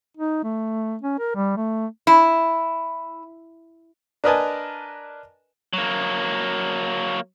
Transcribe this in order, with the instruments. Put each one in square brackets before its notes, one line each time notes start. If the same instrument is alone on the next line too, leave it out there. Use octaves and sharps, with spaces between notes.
[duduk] D#4
A3
C#4
A#4
G3
A3
[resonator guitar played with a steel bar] E4 [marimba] B5
[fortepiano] D4 A#4 B4 D#5 G#5 A5
[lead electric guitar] F#3 A#3